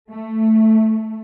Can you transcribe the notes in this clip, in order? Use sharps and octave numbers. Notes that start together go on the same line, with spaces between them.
A3